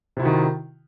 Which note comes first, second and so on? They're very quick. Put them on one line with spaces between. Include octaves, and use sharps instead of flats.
C3 E4 F#4 D#3